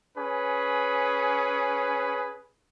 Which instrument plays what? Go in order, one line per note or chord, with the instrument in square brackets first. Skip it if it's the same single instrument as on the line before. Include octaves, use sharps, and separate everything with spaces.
[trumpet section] C#4 G#4 B4